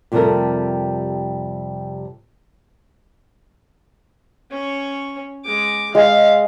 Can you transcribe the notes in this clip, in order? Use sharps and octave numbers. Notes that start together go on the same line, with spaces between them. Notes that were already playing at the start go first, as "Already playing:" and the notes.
F2 C3 G3 A3 A4 A#4
C#4 C#5
G#3 D6
G#3 F5